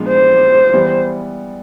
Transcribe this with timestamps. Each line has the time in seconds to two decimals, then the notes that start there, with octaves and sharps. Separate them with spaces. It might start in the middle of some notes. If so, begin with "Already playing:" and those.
Already playing: A#2 F3 G#3 B3 D4
0.09 C5
0.74 E3 G3 B3